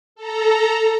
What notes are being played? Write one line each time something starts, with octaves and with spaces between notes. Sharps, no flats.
A4 A#5